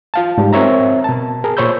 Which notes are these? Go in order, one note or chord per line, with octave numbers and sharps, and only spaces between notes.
F4 F5 A5
G#2 G3 G#3
C4 A#4 C#5 E5 A#5
B2 A5
G#4 A#4
A#2 C5 C#5 B5 E6 G6